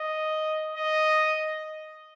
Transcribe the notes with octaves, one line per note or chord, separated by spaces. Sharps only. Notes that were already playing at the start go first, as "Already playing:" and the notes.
Already playing: D#5
D#5